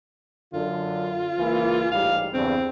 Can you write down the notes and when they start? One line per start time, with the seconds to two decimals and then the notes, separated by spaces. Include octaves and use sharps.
0.53 F#2 D3 F4
1.38 C#2 E3 A#3
1.91 A1 G#2 G3 F5
2.34 E2 G2 C#3 C4